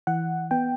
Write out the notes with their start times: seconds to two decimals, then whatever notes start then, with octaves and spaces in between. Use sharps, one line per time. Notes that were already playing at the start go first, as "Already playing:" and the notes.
0.07 E3 F#5
0.51 B3 G5